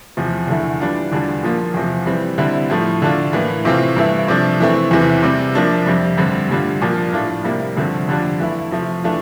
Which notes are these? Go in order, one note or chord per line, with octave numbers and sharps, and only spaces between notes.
E2 C3 F3
E2 D3 A3 E4
E3 G3 D4 F4
E2 D3 G3 D4 F4
A#2 F3 A#3 F4
E2 C3 F3
E3 G3 C4
D3 G3 C4 E4
A2 F3 A3
D3 A3 D4 F4
A2 E3 A#3
C3 E3 A3 C4 F4
G2 E3 A3 E4
C3 F3 A3 D4
E3 A3 C4
E2 C3 E3
C3 G3 C4
C3 F3 A#3 D4
F2 C3 G3
G2 D3 G3 C4
G2 D3 G3 D4 F4
A#2 F3 A#3 D4 F4
A2 F3 A3 D4 F4
C3 G3 A#3 E4
G2 D3 F3 A3 C4
F2 D3 G3 D4 F4
E3 A3 E4
C3 F3 A3
E3 A3 D4 F4